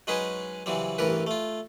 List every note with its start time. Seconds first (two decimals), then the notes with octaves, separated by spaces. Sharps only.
0.07 F#3 G#3 C#4 D#4 G#4 B4
0.66 C#3 E3 F#3 G3 C4
0.98 A1 G2 E3 A#4 B4
1.27 A3 F4